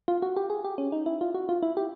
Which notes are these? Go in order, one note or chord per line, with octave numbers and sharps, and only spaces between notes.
F4
F#4
G4
G#4
G4
C#4
D#4
E4
F4
F#4
F4
E4
G4